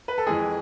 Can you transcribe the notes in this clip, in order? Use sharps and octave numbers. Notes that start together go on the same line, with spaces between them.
B4
A4
F2 E3 G#3 G#4